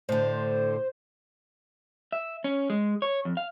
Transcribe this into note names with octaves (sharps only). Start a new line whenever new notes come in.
A2 D3 C5
E5
C#4
G#3
C#5
F2
F5